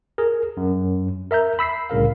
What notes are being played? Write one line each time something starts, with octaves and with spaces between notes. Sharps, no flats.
G#4 A#4
F#2
A#4 E5 A#5 G6
B5 E6 B6 C7
C2 A2 C#3 A#4 F5